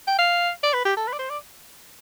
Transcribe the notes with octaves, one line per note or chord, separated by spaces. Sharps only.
G5
F5
D5
B4
G4
A4
B4
D5
C5
D5